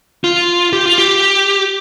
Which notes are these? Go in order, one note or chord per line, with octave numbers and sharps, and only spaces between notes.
F4
G4
F4
G4